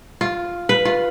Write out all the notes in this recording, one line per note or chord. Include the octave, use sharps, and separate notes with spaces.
F4
B4
F4